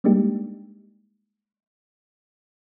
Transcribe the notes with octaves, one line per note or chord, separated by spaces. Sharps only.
G3 G#3 A#3 D4 D#4 G4